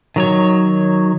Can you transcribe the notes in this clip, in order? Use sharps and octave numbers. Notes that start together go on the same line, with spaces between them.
D#3 F#3 C#5